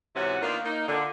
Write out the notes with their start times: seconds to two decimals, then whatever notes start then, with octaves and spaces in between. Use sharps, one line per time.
0.15 G#2 C3 E3 C#4 F#4 F#5
0.41 D#3 A#3 B3 D4 F4
0.64 A#3 D#4
0.87 A#2 D3